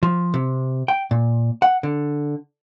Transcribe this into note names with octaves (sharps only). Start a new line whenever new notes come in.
F3
C3
G5
A#2
F#5
D3